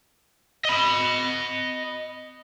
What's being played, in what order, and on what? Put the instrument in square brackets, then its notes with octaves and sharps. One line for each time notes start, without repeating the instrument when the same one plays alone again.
[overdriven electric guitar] D#5 B5